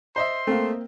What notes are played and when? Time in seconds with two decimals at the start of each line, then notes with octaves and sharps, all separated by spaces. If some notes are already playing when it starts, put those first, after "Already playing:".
0.16 C5 D#5 E5 C6
0.47 A3 A#3 C4